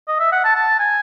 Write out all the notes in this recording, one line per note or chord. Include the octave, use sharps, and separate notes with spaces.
D#5
E5
F#5
A5
A5
G#5